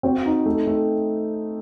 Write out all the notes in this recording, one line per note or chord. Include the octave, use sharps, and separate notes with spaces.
C4 F#4
D#4
A3
A3